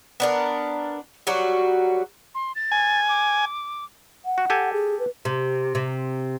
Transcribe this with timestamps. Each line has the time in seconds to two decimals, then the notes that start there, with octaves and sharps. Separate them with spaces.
0.20 B3 D4 A#4
1.27 F#3 G3 F#4 A#4
2.35 C6
2.55 A6
2.72 G#5
3.09 D6
4.25 F#5
4.38 F#4
4.50 G4 A4 G#5
4.73 G#4
4.99 B4
5.25 C3
5.75 C3